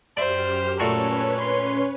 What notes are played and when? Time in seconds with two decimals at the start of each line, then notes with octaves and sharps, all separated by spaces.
0.17 F#2 G4 C5 D5 E5 F6
0.80 A#2 A3 C#4 F#4 A4 B4 C#5
1.40 C6